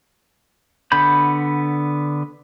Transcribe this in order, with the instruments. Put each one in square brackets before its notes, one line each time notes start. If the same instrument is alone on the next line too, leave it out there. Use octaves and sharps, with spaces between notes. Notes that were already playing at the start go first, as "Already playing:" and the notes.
[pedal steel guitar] D3 B3 B5 G6